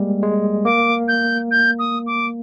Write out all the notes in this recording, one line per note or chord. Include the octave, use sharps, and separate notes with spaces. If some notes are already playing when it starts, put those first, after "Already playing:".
Already playing: G3 G#3 A#3
G#3
A#3 D6
G6
G6
D#6
D6